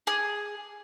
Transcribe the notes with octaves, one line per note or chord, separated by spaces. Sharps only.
G#4